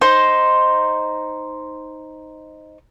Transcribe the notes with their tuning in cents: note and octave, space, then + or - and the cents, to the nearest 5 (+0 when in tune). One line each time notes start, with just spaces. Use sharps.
D#4 +0 C5 +0